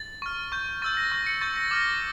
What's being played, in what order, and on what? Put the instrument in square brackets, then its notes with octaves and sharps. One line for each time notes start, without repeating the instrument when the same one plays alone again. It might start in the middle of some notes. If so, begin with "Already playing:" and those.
Already playing: [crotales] A6
C#6 F6
C#6 G6
C#6 E6 G6 A6
A#6
C#6 G6 A#6
C#7
C#6 G6 A6
A#6
A6
D6 F6 A#6